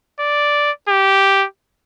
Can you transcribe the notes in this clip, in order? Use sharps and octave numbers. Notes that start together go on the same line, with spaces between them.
D5
G4